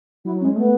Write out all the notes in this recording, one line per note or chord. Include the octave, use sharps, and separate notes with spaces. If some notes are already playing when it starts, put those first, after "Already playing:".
F#3 E4
F#3
C#4
G#3
A3 B3